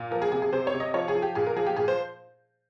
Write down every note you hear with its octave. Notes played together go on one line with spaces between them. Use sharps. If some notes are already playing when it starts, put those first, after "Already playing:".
Already playing: A#2
F3 A#4
G#4
C3 G#4
G#4
C3 C5
C#5
C3
D#5
F3 C#5
G#4
F3
G4
A#2 G#4
A#4
F3 G#4
G4
A#2 G#4
C5